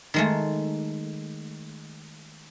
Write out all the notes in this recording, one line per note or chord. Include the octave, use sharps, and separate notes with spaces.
D#3 G#3 A3